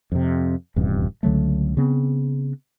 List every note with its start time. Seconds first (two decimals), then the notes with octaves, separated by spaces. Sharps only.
0.12 F2 C3
0.76 D#1 E2 G2 C3
1.23 C#2 D3 F#3 A3
1.77 C#3 B3 C4